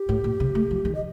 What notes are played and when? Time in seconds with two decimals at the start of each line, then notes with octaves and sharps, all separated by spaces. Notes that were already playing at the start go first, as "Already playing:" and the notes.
Already playing: G4
0.09 A2
0.24 A#2
0.40 C3
0.55 A3
0.71 F3
0.85 D#3
0.95 D#5